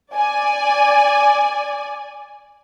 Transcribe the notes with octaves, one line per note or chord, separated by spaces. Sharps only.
D5 G#5